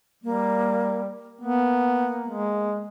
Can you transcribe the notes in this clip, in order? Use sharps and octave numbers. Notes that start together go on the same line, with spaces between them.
G3 A#3
A#3 B3
G#3